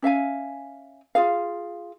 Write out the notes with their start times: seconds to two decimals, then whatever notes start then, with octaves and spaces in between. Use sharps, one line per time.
0.02 C#4 E5 F5 G#5
1.15 F4 G#4 F5